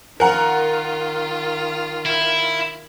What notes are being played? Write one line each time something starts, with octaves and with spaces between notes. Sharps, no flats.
D#3 F4 A#4 F#5 A#5
E4